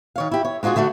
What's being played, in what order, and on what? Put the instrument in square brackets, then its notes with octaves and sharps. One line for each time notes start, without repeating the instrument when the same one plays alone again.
[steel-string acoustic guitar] D#3 C#5 F5
E4 G4
C#5
G#3 D4 F4 F#4 G#4
D3 A3 D4 F#4